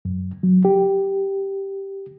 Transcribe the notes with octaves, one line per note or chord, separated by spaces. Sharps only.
F#2
F#3
G4